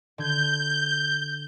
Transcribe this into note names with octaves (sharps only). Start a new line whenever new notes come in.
D3 G6 G#6